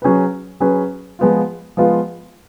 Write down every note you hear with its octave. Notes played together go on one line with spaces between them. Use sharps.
F#3 C#4 G#4 B4
F#3 C#4 G#4 B4
F3 G#3 B3 F4
F3 G#3 B3 F4